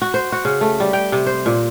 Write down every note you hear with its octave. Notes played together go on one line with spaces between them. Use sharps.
F#4
C5
F#4
C#3
A3
G3
G5
C3
C5
A#2